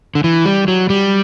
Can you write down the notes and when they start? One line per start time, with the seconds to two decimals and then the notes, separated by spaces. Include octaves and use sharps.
0.15 D3
0.24 E3
0.45 G3
0.68 F#3
0.90 G3